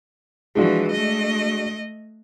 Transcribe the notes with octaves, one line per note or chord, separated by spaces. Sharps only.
E3 F3 G#3 D4 F#4
A3 D#5